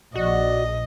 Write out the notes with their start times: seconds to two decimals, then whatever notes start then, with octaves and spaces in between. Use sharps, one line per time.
0.15 A#1 F#4 D5 D#5